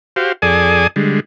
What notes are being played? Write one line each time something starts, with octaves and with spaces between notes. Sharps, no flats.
F#4 G4 C5 F5
F2 G#4 A4 D5 G#5 D#6
D3 G3 G#3